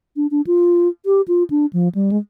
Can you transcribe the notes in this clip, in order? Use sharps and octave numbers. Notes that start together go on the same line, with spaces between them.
D4
D4
F4
G4
F4
D4
F3
G3
G#3